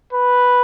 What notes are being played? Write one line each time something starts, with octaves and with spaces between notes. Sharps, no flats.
B4